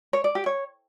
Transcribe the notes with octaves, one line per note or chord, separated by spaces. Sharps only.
C#5
D5
G4
C#5